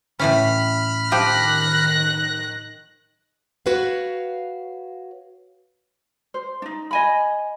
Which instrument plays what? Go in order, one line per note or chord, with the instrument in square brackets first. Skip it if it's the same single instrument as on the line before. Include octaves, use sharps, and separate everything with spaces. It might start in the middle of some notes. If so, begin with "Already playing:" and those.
[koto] A2 E3 C#4 [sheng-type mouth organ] B5 F6
[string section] D#3 F#6 A#6 [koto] F3 G4
[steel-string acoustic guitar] F#4 B4 C#5 F5
[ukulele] C5
D4 D#4
D#5 G#5 B5